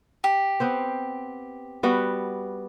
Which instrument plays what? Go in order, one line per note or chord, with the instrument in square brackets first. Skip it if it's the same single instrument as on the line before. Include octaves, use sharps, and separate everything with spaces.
[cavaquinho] G4
[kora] B3 C4 C5
G3 B3 F#4